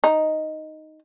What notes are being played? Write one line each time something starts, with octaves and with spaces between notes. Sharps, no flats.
D#4